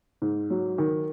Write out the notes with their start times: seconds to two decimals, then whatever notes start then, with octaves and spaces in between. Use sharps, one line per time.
0.22 G#2
0.50 F#3
0.78 D#3